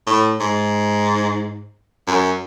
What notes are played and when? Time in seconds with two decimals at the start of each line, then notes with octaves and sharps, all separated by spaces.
0.06 A2
0.40 G#2
2.07 F#2